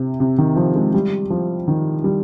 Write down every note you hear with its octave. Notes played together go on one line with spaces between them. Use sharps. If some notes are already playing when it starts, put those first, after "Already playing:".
Already playing: C3
C3
D#3
F3
G#3
G3
F3
D#3
G3